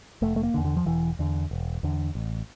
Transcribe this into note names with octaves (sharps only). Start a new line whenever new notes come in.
F1 A3
A3
A#3
D3
E2
D3
F3
E1 E3
E2 D3
E1
E2 D3
A1